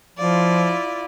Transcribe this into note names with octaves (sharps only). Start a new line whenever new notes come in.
F3 E4 F4 D5